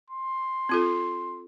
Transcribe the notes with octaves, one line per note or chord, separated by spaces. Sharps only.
C6
C4 F4 A4